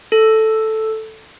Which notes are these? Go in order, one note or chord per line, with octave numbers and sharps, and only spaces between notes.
A4